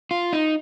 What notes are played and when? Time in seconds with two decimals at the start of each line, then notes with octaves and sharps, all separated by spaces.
0.11 F4
0.33 D#4